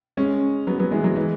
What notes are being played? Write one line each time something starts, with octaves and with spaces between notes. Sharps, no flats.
G#3 C#4
F#3 B3
F#3 B3
E3 G#3
F#3
E3 G#3